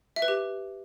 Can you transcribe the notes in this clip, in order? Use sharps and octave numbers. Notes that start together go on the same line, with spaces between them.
E5
B4
G4